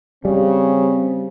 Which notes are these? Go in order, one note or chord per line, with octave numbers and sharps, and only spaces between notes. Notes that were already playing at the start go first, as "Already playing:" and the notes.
C#3 G3 C4